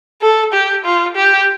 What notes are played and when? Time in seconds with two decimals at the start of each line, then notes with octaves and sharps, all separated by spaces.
0.22 A4
0.53 G4
0.85 F4
1.16 G4